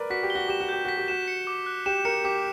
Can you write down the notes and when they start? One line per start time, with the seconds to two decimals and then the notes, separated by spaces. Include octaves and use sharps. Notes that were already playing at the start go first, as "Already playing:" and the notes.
Already playing: A#4 B4 D5
0.10 F#4 B6
0.23 G4
0.30 G7
0.35 F#4
0.48 G4 E7
0.61 F#4
0.69 G4 G6
0.85 F#4 B6
0.98 G4
1.08 F#4 E7
1.28 C#7
1.47 D6
1.66 F#6
1.86 G4 E7
2.05 A#4 C#7
2.24 G4 D6